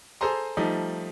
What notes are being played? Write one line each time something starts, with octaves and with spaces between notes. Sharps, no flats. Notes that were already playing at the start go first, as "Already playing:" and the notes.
G#4 A4 C5 G#5 A#5 C6
F3 G3 A3 D#4